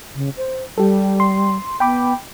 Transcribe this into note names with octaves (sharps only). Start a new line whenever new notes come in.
C#3
C5
G3 G4 A4
C6
B3 G5 B5 D6